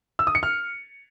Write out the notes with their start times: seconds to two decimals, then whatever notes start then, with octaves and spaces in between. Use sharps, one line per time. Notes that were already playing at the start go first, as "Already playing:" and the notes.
0.19 E6
0.27 D#6
0.35 C#7
0.43 F6